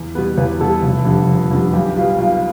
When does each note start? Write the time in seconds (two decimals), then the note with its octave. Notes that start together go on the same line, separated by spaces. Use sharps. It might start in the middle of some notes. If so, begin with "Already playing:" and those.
Already playing: E2
0.15 B2 G3 B3 B4
0.38 E2 B4
0.60 B2 G3 B3 A4
0.83 F1
1.05 F2 D3 G3
1.28 F1
1.51 F2 D3 G3
1.73 B1 G4
1.96 G3 F4
2.00 B2
2.18 B1 F4